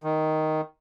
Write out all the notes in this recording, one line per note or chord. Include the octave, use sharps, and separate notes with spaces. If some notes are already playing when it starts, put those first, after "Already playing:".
D#3